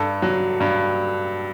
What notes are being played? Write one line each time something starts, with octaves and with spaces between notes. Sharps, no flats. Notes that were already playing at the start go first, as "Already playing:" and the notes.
Already playing: G2 A4
F#3
G2